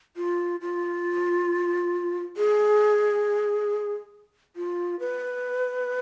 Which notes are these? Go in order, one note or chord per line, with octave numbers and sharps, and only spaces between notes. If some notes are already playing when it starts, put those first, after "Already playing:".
F4
F4
G#4
F4
B4